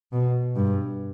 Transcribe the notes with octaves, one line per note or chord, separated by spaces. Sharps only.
B2
G2